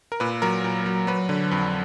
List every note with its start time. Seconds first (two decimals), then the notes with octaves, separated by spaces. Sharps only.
0.12 A#4
0.20 A#2 B4
0.42 F#3 A#4
0.64 A#2
0.86 F#3
1.07 F#3 B4
1.29 D3
1.51 F2